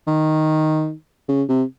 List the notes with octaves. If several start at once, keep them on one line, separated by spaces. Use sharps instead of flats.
D#3
C#3
C3